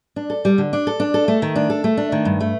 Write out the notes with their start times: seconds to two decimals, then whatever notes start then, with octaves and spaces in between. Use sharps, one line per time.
0.16 D4
0.30 A4
0.45 G3
0.58 D3
0.73 D4
0.87 A4
1.00 D4
1.14 A4
1.28 A3
1.42 D#3
1.56 D4
1.70 A4
1.84 A3
1.97 D4
2.12 D#3
2.25 G2
2.40 A3